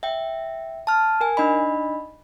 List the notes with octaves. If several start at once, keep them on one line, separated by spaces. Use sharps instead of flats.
E5 G5
A5 F6
A#4 G#5
D4 D#4 D#5 B5